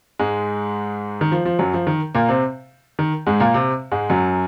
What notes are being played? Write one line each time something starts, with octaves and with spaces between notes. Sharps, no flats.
G#2 G#3
D#3
F3
F3
F#2 F#3
F3
D#3
A#2 A#3
C3 C4
D#3
G#2 G#3
A#2 A#3
C3 C4
G#2 G#3
F#2 F#3